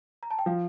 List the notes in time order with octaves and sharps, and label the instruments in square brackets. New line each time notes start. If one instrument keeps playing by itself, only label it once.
[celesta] A#5
A5
G5
[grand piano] F3 [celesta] F5